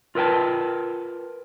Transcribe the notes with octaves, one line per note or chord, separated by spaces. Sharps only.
F4 A#4 B4 G5 A5